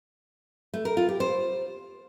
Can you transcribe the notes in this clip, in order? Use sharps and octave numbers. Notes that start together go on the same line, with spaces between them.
A3
A#4
F4
G4
C5